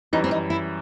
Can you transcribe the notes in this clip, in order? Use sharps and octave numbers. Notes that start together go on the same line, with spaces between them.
F#2 E3 G3 D#4
C4
D#4
E4